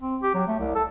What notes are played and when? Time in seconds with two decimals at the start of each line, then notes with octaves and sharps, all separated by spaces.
0.02 C4
0.23 G4
0.35 F#3
0.48 A3
0.59 C2
0.75 A4